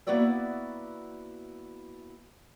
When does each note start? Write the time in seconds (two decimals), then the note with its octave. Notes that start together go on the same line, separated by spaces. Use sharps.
0.07 A#3 B3 E4 F#4 D5 E5